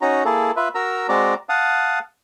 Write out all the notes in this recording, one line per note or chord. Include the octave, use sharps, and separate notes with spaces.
C#4 D#4 F#4 A#5
A#3 E4 G#4 A4
F4 B4 E5
F#4 A#4 A#5 E6
G#3 C4 F#4 D5 A#5
F5 F#5 A5 D#6